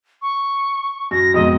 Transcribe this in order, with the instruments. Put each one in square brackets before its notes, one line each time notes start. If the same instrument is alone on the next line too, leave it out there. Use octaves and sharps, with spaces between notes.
[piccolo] C#6
[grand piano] F#2 [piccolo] A#6
[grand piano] F2 G#2 B2 [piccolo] D#5